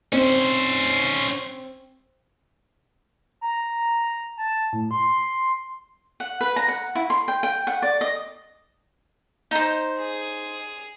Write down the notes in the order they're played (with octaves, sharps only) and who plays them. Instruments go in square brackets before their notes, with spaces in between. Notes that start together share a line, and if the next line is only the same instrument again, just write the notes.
[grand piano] C4 [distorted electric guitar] C#4 C5
[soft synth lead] A#5
A5
A2
C6
[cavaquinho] F#5
B4
A#5
F#5
E4
C6
G5
G5
F#5
D5
D#5
[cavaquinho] D#4 C5 [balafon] D#5 A#5
[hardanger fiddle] G#4